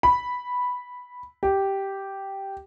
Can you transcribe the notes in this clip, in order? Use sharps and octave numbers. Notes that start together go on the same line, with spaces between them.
B5
G4